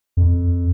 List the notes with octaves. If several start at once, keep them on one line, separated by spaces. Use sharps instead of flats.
F2